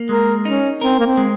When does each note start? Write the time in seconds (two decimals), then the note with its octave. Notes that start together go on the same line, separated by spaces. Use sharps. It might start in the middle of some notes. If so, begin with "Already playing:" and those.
Already playing: A#3
0.09 G#3 A#4
0.45 C#4 D#4
0.81 C4 A#4
1.00 A#3
1.06 C4
1.17 G#3